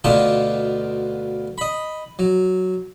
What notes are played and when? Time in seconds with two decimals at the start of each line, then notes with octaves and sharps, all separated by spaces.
0.04 D2 B2 D3 D4 F4 A5
1.58 D#5 B5
2.19 F#3